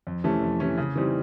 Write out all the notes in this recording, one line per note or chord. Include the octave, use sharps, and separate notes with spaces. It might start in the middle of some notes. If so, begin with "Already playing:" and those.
F2
C3 E3 A3 C#4
F2
C3 E3 A3 C#4
C#3
E3 G3 C4 D#4